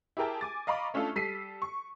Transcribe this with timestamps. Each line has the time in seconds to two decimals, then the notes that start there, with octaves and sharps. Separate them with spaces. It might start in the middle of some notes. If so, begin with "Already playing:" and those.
0.17 E4 G4 G#4 A#4 G5 A5
0.41 G#5 D6 A6
0.67 D#5 F5 A#5 B5 C#6 D6
0.94 A3 C#4 D4 F4 A4
1.15 G3 A4 B6 C7 D#7
1.62 C#6